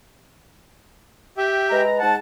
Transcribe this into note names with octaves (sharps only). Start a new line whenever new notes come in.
G4 E5 G5
G#3 B4 A#5
G#2 F#5 A5